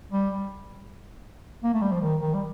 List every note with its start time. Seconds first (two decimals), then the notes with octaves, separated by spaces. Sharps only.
0.12 G3
1.64 A#3
1.74 A3
1.82 G3
1.92 F3
2.01 D#3
2.21 D#3
2.34 G3